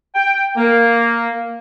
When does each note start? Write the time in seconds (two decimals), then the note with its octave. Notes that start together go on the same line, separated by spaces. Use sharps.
0.15 G5
0.56 A#3